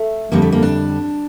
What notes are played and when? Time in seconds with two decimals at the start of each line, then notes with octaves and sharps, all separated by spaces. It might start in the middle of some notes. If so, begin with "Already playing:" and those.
Already playing: A3
0.32 F2 D3 G3 A#3
0.42 A3
0.52 A#3
0.63 D4